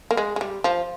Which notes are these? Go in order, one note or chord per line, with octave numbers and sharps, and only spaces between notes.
A#3
G#3
G#3
G3
F3